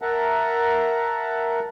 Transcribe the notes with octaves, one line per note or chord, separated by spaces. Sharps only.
A#4 E5 F#5 A5 A#5